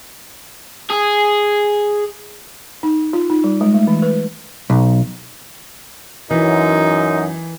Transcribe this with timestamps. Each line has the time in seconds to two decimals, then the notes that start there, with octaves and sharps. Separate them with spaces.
0.91 G#4
2.83 D#4
3.13 F4
3.30 D#4
3.44 G3
3.61 G#3
3.74 A3
3.87 E3
4.02 B4
4.70 B1
6.31 F#2 E3 D#4